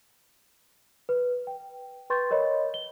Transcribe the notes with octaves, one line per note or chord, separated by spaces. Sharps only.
B4
G5
B4 G5 C6 C#6 G6 A6
A#4 C#5 D#5 B5
G7